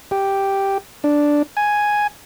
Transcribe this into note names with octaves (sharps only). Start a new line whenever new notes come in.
G4
D4
G#5